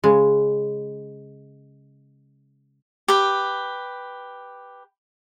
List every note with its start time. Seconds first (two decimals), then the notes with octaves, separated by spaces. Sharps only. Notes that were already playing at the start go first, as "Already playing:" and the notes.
0.04 C#3 G#3
3.08 G4 B4